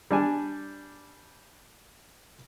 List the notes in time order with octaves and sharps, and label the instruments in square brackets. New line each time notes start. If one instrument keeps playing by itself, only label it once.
[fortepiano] G3 D4 G#5